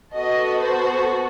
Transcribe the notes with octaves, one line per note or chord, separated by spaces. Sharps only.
B3 F#4 A4 D#5
C5